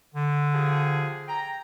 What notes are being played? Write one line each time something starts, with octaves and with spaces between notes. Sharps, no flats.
D3
F3 G4 G#4
G5 A#5